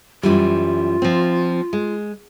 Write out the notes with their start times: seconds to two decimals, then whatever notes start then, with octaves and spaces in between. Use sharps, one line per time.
0.23 F#2 E3 G3 F4
1.02 F3 C4
1.73 G#3